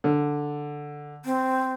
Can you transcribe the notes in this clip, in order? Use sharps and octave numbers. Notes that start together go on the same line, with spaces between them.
D3
C4